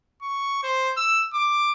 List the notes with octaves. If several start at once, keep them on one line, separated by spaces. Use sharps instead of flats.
C#6
C5
E6
D6